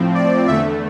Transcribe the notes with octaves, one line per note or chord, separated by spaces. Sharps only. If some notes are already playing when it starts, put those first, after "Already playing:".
Already playing: A2 F3 C4
D5
E2 D3 A3 E5